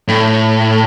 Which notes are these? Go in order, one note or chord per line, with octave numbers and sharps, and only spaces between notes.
A2